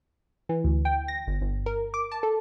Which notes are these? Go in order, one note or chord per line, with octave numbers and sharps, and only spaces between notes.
E3
D2
G5
A#6
G1
G1
A#4
D6
A5
A4